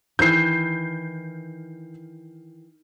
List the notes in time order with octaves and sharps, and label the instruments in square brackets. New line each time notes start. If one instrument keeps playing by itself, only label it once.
[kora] D#3 E3 E4 [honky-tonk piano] G6 C7